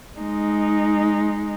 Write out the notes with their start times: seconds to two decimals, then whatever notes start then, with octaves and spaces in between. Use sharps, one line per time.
0.19 G#3 D#4